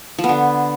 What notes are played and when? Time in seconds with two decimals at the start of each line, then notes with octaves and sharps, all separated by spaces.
0.18 F3
0.24 B3
0.29 D3